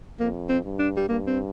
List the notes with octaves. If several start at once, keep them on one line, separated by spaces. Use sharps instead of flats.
F2 A#3
C4
G2
D4
G3
G2 A#3
C4